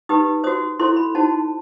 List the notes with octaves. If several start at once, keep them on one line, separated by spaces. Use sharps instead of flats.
D#4 G4 B4 D#6
F#4 C5 D#6
E4 A4 C5 C6
B5
D#4 F#4 C5 A5